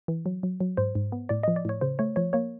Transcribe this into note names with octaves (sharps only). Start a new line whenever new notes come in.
E3
F#3
F#3
F#3
G#2 C5
G#2
B3
A2 D5
F3 D#5
D5
A2 C#5
C#3 C5
A3 C#5
F3 C#5
A#3 C#5